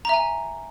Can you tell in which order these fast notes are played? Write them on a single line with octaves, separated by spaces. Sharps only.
A#5 E5 G#5